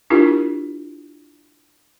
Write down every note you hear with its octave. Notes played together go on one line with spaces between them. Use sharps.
D4 E4 F4 G4 A#4